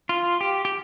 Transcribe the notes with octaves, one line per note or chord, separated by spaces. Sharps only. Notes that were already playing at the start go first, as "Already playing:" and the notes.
F4
G4
G4